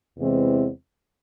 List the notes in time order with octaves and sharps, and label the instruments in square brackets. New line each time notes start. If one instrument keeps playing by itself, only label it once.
[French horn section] E2 C3 E3 G#3 C4